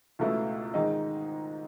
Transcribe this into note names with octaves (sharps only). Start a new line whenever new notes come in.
C#2 B2 A3 E4
G#2 D#3 G#3 D#4